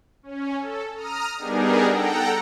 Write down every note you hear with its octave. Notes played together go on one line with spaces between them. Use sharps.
C#4
A4
A#5 D#6 F6
G3 B3 D4 D#4 G#4 A#4
A4 F#5 G5 A#5